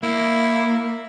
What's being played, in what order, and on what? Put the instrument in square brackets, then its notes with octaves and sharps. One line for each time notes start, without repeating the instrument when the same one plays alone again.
[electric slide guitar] A#3 [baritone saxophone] E4